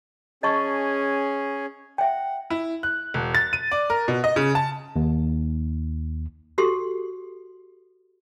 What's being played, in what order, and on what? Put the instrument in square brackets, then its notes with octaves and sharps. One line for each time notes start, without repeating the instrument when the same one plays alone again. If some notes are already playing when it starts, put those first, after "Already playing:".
[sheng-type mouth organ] C#4 G#4 [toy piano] D#5 A5 C#6
[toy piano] E5 G5 [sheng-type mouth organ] F#5
[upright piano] E4
F#6
E1
A6
D#7
D5
A#4
B2
D#5
C#3
A5
[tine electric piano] D#2
[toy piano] F#4 G4 A4 C6